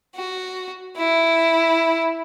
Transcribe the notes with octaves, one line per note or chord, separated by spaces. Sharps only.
F#4
E4